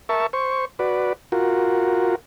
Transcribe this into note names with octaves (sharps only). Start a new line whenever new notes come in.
A#4 E5 A5 C#6
C5 C#6
F#4 B4 D5
F4 F#4 A#4